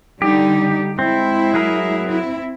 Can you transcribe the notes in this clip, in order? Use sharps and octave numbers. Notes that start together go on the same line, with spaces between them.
D3 G3 D#4 G4
G#3 C4 E4
F#3 G#4 A#4
C4 E4